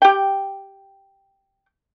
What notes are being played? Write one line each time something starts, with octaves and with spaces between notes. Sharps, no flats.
G4 G5